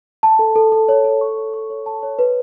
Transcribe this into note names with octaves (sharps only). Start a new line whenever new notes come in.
A5
A4
A4
A4
C#5
A4
C#6
C#5
C#6
C#5
A5
C#5
B4